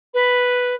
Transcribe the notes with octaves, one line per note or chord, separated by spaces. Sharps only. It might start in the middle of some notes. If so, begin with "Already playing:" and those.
B4